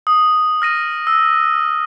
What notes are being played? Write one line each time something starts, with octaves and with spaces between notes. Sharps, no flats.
D#6
F6 A#6 D#7
E6